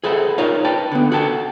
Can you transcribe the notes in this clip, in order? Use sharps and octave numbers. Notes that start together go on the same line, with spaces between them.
G#4 A4 B4 E5 F#5
D#4 F4 A#4 C#5 F5
B4 G5 A5
D3 B3
F#4 A4 G5 A5